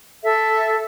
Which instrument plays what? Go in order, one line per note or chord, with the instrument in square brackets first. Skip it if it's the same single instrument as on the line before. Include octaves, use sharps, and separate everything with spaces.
[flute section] A4 E5